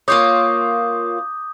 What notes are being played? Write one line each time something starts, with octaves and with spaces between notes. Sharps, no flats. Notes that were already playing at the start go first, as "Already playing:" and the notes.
A#3 F4 C#5 D6 D#6 G6